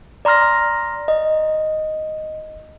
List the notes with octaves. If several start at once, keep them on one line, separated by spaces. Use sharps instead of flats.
D5 A#5 C6 F6 A#6
D#5